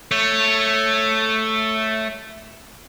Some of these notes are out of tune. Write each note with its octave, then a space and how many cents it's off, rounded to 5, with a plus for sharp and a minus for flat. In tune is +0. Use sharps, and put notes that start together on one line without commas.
A3 +0 C#5 +0